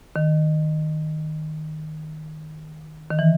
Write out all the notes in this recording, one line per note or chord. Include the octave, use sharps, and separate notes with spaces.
D#3
D#3
E3